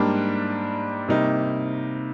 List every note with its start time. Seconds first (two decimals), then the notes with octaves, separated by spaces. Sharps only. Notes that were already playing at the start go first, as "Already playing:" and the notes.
Already playing: G#2 G3 A#3 D4
1.08 C3 G3 A#3 D#4